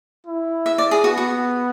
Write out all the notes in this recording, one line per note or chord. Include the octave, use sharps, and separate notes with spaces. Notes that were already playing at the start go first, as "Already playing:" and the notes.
E4
E5
D5
G#4
B3 F#4
F#4